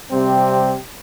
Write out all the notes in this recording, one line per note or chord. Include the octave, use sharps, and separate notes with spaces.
C3 G3 C4 G4